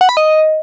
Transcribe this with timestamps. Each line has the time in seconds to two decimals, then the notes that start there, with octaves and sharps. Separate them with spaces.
0.01 F#5
0.09 B5
0.17 D#5